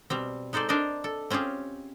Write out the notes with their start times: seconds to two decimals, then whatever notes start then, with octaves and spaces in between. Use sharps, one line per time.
0.10 B2 G3 C4
0.53 G#3 D#4 A4 C5 D5
0.68 D4 A#4 C5 D5 D#5
1.04 A4
1.30 C4 C#4 F4 G4 G#4